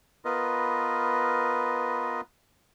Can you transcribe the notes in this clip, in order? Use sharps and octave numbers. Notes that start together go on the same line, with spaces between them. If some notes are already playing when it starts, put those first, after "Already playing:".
B3 F4 A#4 B4 D#5